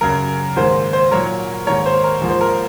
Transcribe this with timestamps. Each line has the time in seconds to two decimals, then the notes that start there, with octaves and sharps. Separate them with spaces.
0.01 F#2 C#3 F#3 A#4
0.56 G#2 D#3 A#3 C5
0.93 C5
1.11 A#2 F#3 A#3 A#4 C#5
1.67 G#2 D#3 A#3 A#4 C#5
1.86 C5
2.04 A#4
2.22 G#2 F3 A#3
2.30 C5
2.41 A#4